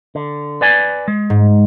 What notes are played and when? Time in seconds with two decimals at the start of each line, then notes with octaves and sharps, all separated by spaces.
0.15 D3
0.61 B4 D5 G#5
1.08 G#3
1.30 G#2